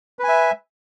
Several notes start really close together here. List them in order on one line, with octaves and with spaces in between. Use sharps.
B4 G#5 E5